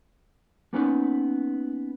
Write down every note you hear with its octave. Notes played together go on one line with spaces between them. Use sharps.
A#3 B3 C#4 D#4 B4